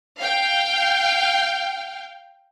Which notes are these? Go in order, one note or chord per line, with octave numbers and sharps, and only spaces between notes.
F5 G5